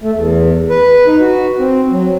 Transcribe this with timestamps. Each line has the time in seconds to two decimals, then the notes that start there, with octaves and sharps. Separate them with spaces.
0.01 A3
0.15 E2
0.70 B4
1.07 D#4
1.20 F#4
1.59 C4
1.91 F#3